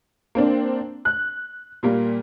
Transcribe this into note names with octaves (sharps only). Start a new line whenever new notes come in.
A#3 C4 D4
F#6
A#2 G3 A#3